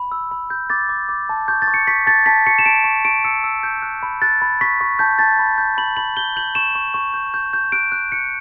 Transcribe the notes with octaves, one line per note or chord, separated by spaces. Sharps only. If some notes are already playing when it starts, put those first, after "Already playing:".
Already playing: B5
E6
B5
G6
D6 A6
D6
D6
A5
C#6 G6
A6
C#6
C#7
C#6 B6
A5 A6
A5 B6
C#6 C#7
E7
A5 D7
C#6
C#6 D7
E6 C#7
E6
G6
F#6
B5
F#6 A6
B5
C#6 B6
C#6
A5 G6
A5 A6
B5
G6
B5 F#7
B5 F#7
G6 G7
G6 F#7
C#6 E7
C#6
C#6
G6
G6
G6
F#6 D7
F#6
F#6 C#7